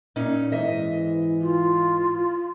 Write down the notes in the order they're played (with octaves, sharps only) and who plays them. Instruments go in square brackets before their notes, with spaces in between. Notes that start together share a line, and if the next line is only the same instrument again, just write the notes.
[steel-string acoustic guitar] A#2 C#4 D#4
[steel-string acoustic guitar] G#2 D#5 E5 [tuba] E3
[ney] F4